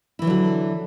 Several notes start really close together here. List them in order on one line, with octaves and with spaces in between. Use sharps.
E4 E3 F#3 D3 F#4